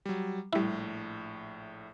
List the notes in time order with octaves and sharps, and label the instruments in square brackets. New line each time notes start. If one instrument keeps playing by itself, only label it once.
[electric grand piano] F#3 G3
[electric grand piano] A#1 A2 [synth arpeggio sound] G3 E4